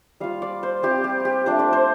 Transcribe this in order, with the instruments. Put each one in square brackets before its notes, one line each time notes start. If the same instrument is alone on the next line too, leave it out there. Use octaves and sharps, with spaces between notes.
[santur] G3 F4 F5
D5
C5
G3 C4 F4 G4
G4
G4
A3 D4 F4 C5
D5
C5